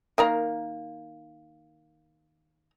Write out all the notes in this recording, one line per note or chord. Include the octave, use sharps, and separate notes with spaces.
D#3 A#3 A#5